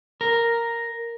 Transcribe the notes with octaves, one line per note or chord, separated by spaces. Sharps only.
A#4